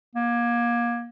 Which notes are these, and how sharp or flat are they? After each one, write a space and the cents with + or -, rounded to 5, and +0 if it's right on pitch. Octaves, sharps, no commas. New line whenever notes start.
A#3 +25